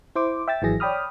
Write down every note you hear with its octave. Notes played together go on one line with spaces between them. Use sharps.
E4 C5 D6
E5 G5 E6 A6
G#1 E3 F#3 G#4 A#6
C#5 D5 G5 B5 D#6 F6